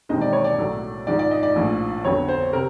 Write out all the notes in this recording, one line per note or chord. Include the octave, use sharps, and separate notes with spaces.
E1 D#2 D#3 G#3 C4 D#5
D5
C#5
D5
B1 A2 F#3 A3
G#1 G#2 F3 G#3 D5
D5
D#5
D5
A#1 A2 F3
F2 D3 F#3 B3 C#5
C5
C3 A#4